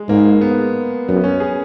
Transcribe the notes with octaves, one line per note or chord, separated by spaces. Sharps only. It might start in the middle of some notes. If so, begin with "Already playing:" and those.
Already playing: G#3
G#2 A#3
B3
F#2 B3
C#4
G#4